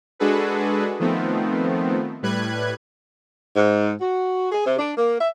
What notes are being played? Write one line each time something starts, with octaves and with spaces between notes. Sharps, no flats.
G#3 D4 F#4 G#4 A4 B4
D#3 F3 A3 B3 C4
A2 G3 B4 F#6 G#6
G#2
F#4
G#4
C3
D4
A#3
E5